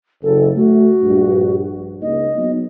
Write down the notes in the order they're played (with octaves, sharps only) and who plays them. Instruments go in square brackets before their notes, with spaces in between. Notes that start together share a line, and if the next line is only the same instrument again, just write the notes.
[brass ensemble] F#1 [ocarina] A4
[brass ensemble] A3 [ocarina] F#4
[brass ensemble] A#1 G2
[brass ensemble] C#2 A#3 D#4 [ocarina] D#5
[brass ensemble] F#3 B3 D#4